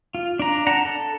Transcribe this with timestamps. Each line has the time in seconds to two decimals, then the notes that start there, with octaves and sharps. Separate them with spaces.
0.15 F4
0.39 D4 A#5
0.67 D4 F#5 A#5
0.85 A4